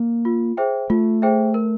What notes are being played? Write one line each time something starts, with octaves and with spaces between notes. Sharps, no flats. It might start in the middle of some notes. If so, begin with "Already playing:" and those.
Already playing: A#3
F4
G#4 C5 E5 G5
A3 F4
G#4 C5 E5 G5
A#4